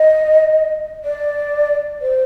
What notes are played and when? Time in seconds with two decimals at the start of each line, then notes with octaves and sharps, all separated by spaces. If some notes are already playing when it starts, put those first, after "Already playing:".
Already playing: D#5
1.05 D5
2.02 C5